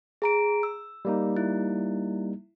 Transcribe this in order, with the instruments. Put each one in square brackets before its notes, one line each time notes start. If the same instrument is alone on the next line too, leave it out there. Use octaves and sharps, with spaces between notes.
[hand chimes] G#4 A#5 D7
E6
[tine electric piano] G3 A#3 D#4
[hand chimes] E4